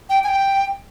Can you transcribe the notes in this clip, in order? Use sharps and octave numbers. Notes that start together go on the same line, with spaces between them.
G5
G#5
G5